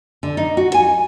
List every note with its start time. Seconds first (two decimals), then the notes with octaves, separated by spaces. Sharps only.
0.23 D3
0.37 D#4
0.57 F#4
0.74 G#5